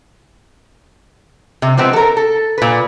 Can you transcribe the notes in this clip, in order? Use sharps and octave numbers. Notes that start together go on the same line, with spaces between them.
C3
F3 G#3 B3 C4
A4 A#4
A4
A#2 B4